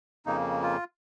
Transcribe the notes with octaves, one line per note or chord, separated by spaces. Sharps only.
F2 C#3 A#3 D#4
F4